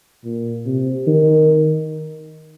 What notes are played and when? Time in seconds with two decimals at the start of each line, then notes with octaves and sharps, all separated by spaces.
0.25 A#2
0.66 C3
1.07 D#3